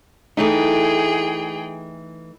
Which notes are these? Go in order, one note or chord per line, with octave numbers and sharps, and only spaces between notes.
E3 A3 D#4 G#4 G5